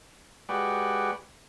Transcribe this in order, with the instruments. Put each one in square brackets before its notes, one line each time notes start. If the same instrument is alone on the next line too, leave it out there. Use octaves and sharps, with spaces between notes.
[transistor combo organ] G#3 F#4 G4 B4 D5